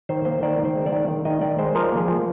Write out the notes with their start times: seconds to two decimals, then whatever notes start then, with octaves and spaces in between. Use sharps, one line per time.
0.09 D#3 C5
0.25 A#3 C5
0.42 D#3 D5
0.59 D#3
0.65 C5
0.75 G#3
0.86 D5
0.92 D#3
1.08 D#3
1.25 D#3 D#5
1.41 D#3 D5
1.59 G#3 C5
1.75 F3 A#4
1.92 A#3
1.98 G#4
2.08 F3